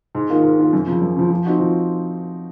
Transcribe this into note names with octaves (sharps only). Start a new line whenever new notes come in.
G#2
D#3 A#3 F4
G#2
D#3 A#3 F4
F#2
C#3 F3
F#2
C#3 F3
F3
C4 D#4 F#4
F3